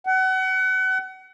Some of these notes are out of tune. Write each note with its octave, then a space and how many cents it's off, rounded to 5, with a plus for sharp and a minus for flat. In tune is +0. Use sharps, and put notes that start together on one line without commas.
F#5 +30